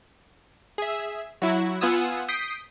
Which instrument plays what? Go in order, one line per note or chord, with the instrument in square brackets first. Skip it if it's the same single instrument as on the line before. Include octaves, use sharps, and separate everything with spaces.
[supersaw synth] G#4 E5
F#3 E4 F#4
B3 F4 F#5 G#5 D#6 E6
D#6 G6 B6 C7 D7